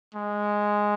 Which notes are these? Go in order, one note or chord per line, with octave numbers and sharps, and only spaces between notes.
G#3